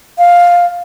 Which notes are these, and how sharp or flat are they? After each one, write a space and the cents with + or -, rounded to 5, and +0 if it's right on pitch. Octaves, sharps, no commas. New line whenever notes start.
F5 +5